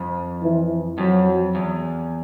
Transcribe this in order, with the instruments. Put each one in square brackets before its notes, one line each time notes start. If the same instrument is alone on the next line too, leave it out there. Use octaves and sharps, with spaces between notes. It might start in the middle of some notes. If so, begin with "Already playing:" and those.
Already playing: [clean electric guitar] F2
[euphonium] E3
[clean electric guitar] F2 [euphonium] F#3
[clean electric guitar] E2